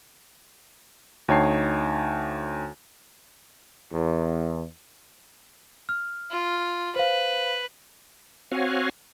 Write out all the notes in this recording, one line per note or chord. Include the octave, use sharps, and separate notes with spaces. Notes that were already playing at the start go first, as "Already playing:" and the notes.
D2 D#4 C#5 G5 A5 C7
E2
F6
F4
B4 C5 F5
C4 F#4 C#5 F5 F#5 G#5